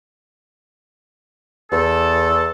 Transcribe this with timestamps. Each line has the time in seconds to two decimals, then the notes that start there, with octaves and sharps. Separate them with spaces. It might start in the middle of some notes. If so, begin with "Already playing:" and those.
1.71 E2 A4